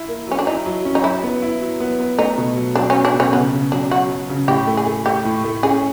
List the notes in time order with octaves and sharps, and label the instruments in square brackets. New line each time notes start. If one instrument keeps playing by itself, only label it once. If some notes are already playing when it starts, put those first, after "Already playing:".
Already playing: [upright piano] E4
A#3
[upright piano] F#3 [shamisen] C#4
[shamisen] D4
[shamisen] D#4 [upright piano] E4
[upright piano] F#3
C#4
[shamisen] D#4
[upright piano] F#3 [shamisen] E4
[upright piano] B3
E4
F#3
B3
B3
[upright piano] A3 [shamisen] D#4
[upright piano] B2
F#3
[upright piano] F#3 [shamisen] D4
[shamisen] C#4
[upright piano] F#3
[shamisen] D4
[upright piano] B2
[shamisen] C#4
[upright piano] C#3 [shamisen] B3
[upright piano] C#3
[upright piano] F#3 [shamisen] D4
[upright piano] F#3 [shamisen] F#4
[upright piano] F#3
C#3
[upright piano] A2 [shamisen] G4
[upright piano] A3
[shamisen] G#4
[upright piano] A3
[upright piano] A3 [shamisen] G4
[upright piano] A2
A3
[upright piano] C#4 [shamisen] G#4